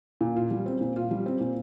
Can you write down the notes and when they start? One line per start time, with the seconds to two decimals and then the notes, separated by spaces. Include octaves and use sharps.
0.21 A#2
0.36 F4
0.51 G3
0.66 C4
0.81 A#2
0.96 F4
1.11 G3
1.26 C4
1.40 A#2